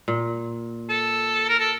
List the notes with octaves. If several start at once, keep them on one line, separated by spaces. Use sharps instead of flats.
A#2
A4
A#4
A4